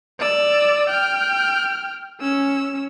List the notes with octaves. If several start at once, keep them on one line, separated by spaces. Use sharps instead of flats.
D5 E6
G5 F6
C#4 E6